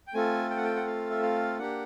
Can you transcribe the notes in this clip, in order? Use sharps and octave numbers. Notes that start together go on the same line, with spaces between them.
G5
A3 C4 F4 A4 G#5
G5
F#5
G5
F#5
F5
E5
F5
A#3 D4 G4 F#5